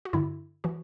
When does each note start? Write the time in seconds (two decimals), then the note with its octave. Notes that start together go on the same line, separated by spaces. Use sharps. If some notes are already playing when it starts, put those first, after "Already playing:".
0.05 F#4
0.13 G2 D3 E4
0.64 E3 F#4